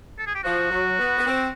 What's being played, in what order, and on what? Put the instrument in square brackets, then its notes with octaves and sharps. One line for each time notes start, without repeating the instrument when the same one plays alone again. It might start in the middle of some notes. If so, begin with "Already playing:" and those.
[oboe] A4
G#4
G4
[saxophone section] F3 [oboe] F#4
[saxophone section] F#3
B3
B3
C4